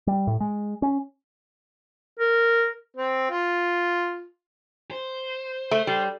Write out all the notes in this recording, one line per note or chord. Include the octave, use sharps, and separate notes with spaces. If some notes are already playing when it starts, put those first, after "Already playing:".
G3
A2
G#3
C#4
A#4
C4
F4
C5
A3
G3